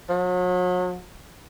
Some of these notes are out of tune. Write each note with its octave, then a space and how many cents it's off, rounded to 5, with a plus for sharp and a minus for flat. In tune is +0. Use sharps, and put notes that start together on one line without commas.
F#3 -40